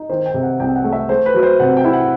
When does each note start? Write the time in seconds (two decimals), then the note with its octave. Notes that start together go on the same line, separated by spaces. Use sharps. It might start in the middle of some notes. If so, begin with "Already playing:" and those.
Already playing: D#4
0.09 D#3 C5
0.26 G5
0.34 C3
0.43 F#5
0.60 C2 G5
0.76 F#5
0.84 A3
0.93 E5
1.09 A3 C5
1.26 B4
1.35 F#3
1.43 C5
1.60 C3 F#5
1.77 G5
1.84 E4
1.93 F#5